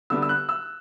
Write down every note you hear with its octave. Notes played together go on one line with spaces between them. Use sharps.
D3 G3 B3 D4 E6
E6
F#6
E6